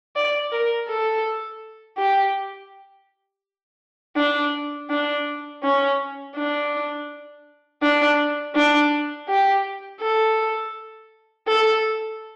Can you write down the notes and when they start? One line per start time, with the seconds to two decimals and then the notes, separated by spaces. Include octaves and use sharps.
0.16 D5
0.52 A#4
0.88 A4
1.98 G4
4.16 D4
4.90 D4
5.63 C#4
6.36 D4
7.83 D4
8.55 D4
9.28 G4
10.02 A4
11.48 A4